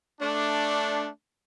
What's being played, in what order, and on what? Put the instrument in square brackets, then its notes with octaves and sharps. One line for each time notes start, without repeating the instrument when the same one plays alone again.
[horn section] A3 D4